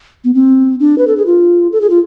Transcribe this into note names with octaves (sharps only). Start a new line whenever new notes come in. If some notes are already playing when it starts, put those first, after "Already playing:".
B3
C4
D4
B4
A4
G#4
F4
A4
G#4
F4